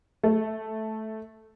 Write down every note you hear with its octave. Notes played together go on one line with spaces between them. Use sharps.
A3